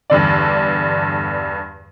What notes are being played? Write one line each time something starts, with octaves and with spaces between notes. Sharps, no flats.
E2 G2 D3 D5